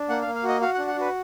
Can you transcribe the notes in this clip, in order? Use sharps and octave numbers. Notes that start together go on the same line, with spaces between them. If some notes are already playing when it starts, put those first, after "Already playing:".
Already playing: D4
A#3 F#5
F5
A#3
F5
F#4 D#5
F#4 F5
D4 F#5
F#5
F#4 B4